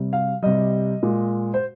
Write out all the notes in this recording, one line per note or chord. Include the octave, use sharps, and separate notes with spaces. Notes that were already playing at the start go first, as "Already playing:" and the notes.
Already playing: C3 G3
F5
C3 G3 D#5
A#2 G#3
C5